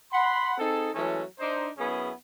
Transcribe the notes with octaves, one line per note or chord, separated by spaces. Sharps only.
F#5 B5 C6
C4 D#4 G#4 A4
E3 F#3 G#3 A3 C#4 A4
D4 D#4 C5
F#2 B3 C#4 E4 G#4